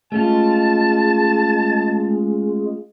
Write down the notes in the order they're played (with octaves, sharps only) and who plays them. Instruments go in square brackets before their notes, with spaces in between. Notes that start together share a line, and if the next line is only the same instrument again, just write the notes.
[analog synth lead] G#3 [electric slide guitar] A3 C#4 F4 [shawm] A5